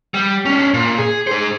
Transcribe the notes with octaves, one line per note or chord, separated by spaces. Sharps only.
G3
C#4 D4
A#2
G#4
G#4 C5